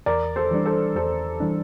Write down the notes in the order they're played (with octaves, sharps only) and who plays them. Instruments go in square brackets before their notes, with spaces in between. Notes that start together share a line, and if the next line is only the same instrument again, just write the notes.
[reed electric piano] E2 [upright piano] A#4 D5
[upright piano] A4 C5
[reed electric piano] E3 G3 D4
[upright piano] A4 C5
[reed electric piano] E2 [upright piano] A4 C5
[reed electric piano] E3 G3 D4